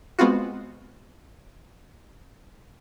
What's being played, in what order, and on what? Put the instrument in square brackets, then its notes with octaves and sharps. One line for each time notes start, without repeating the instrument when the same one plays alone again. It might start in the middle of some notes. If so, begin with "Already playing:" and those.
[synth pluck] G#3 B3 C4 F4 F#4